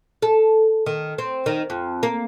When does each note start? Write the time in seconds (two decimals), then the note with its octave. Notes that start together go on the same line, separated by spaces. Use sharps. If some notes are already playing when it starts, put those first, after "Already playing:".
0.22 A4
0.86 D#3
1.18 C4
1.46 D#3
1.70 F2
2.03 A#3